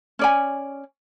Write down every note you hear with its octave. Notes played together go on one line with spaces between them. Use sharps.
C#4 D5 G#5